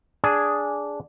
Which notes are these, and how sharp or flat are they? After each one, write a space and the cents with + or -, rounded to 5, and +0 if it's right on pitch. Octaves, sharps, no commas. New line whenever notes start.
D4 -10 G#4 +0